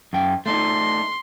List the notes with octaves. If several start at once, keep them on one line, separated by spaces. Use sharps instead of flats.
F#2 G5
A3 D4 D#4 C6